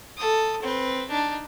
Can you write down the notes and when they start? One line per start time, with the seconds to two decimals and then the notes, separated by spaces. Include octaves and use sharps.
0.17 A4 D#6
0.62 C4 B4
1.10 D4 D#4